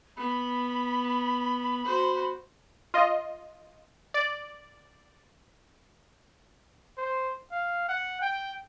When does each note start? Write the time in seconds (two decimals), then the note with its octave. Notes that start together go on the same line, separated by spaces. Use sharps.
0.17 B3 B5
1.85 F#4 C5
2.94 F4 D#5
4.14 D5
6.98 C5
7.52 F5
7.88 F#5
8.21 G5